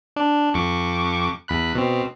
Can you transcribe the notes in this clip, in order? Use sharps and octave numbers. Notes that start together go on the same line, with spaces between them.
D4
F2 C#6 D6
E2 B5 F#6
B2 C4